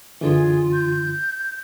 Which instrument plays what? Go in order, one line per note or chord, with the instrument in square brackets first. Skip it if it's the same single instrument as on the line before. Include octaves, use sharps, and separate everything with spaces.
[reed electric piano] F#2 D3 E3 [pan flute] F4 [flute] G#4
[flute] G6